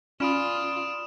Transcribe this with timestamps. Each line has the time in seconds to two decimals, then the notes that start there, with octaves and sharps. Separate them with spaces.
0.20 C#4 F4 D5 B5 D#6 D7 E7